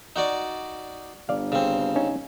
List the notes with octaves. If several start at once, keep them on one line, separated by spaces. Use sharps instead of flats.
D#4 F#4 D5
G1 D5 F5
C#3 C4
C#4 D#4